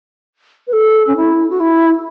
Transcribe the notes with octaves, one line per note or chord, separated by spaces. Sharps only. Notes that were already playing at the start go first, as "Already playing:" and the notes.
B4
A4
C#4
E4
F#4
E4